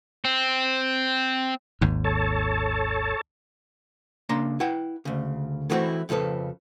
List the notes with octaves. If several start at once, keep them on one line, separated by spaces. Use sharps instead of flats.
C4
G#1 D#2 G#2
A4 C#5 A5
C#3 A#3 D4 A#5 C6
E4 B4 F#5 G5
D2 C#3
E3 A3 B3 C4 E4 F#4
F2 C#3 F3 A4 B4